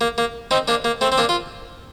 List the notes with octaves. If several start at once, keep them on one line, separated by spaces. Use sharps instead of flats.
A#3
A#3
C4 D#4
A#3 D4
A#3
A3 C4
C4
A#3 D4
F4